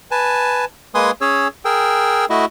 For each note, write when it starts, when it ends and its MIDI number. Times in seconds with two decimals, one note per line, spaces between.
0.11 0.65 71
0.11 0.65 80
0.11 0.65 81
0.95 1.11 56
0.95 1.11 58
0.95 1.11 71
0.95 1.11 80
0.95 1.11 84
0.95 1.11 87
1.21 1.48 61
1.21 1.48 68
1.21 1.48 73
1.21 1.48 88
1.65 2.25 68
1.65 2.25 70
1.65 2.25 79
1.65 2.25 88
2.30 2.45 57
2.30 2.45 64
2.30 2.45 66
2.30 2.45 75